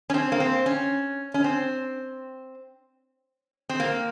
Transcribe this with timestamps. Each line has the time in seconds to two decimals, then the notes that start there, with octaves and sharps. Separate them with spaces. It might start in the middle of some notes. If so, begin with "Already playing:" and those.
0.10 C#4
0.14 C4
0.32 A#3
0.40 C4
0.66 C#4
1.34 C#4
1.44 C4
3.69 C4
3.80 A#3